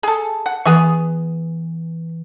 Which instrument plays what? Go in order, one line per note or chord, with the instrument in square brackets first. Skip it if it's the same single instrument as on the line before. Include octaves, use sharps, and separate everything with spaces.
[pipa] G#4 A4
F#5
[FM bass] E3 [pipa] B3 G#4 C#6